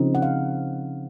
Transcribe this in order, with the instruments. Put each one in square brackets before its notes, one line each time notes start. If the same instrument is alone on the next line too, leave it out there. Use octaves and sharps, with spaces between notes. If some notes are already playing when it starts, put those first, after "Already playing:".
Already playing: [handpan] C#3 F3 C4 D#4
F#5
F5